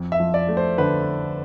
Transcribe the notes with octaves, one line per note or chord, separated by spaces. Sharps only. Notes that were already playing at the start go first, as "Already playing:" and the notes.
Already playing: F2
E5
F3
D5
A3
C5
D3 B4